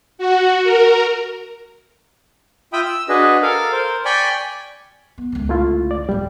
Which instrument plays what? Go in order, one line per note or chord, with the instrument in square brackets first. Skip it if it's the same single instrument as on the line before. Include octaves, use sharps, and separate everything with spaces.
[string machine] F#4
A#4
[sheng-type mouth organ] F4 E5 G5 B5 D#6
E6
D4 F#4 G#4 B4 D#5
A4 A#4 F5
A#4 C5
D5 G5 G#5 B5 C#6
[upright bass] B3
C#2 D3
[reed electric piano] A3 E4 F4
D5
[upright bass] D#1 A1 [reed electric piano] G3